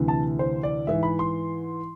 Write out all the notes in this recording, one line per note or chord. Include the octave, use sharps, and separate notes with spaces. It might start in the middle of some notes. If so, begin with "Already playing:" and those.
Already playing: D2 C3 E3
A5
C5
D5
G#2 E3 E5
B5
C6